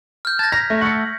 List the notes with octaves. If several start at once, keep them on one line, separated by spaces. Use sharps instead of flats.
F6 G6
A5 G#6 A#6
A#5 A#6 B6
A3
A3 A4 F#5 C#6 C#7